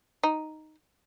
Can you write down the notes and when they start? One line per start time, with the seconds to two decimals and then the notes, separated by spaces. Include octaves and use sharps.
0.23 D#4